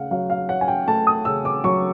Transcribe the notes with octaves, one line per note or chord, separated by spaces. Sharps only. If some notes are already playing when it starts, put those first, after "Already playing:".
Already playing: C#3 A3 F5 F#5
F#3 F5
F5
C#4 F#5
G#5
G5
A3 A5
D#6
C#3 E6
D6
F#3 C#6